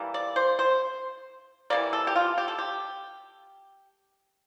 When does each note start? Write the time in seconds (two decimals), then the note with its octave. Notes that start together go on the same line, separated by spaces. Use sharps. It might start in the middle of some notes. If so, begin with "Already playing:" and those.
Already playing: E3 G3 A#3
0.14 D5
0.36 C5
0.59 C5
1.70 E3 G3 A#3 D5
1.93 A4
2.07 G4
2.16 F4
2.38 G4
2.48 A4
2.58 G4